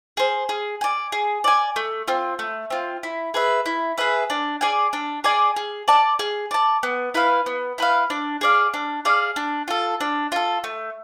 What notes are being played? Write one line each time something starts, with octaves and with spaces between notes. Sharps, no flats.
G#4 C5
G#4
D5 G#5
G#4
D5 G#5
A3
C4 F4
A3
C4 F4
E4
G#4 B4 E5
E4
G#4 B4 E5
D4
G#4 D5 G#5
D4
G#4 D5 G#5
G#4
D5 A5
G#4
D5 A5
B3
E4 B4 F5
B3
E4 B4 F5
D4
G#4 D5 F5
D4
G#4 D5 F5
D4
F4 A4
D4
F4 A4
A3